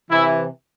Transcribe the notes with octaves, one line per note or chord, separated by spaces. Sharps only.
C3 E3 E4